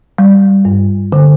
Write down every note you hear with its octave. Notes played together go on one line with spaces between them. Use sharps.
G3
G2
D3